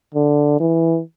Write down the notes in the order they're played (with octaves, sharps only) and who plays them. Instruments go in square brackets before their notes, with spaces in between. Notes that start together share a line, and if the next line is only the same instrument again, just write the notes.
[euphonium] D3
E3